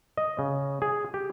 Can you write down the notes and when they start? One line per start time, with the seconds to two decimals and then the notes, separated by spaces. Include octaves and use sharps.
0.18 D#5
0.39 C#3
0.82 G#4
1.14 G4